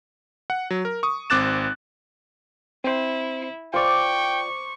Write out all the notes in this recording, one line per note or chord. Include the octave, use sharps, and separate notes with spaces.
F#5
F#3
A#4
C#6 D#6
G#1 C4 D6 F#6 A6 E7
C4 E4 C5
F4 C5 D5 G5 C#6 D6